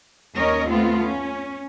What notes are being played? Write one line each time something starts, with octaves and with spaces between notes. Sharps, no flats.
D#2 C#4 A#4 C#5 D#5
A3 B3 C4 F4
C#4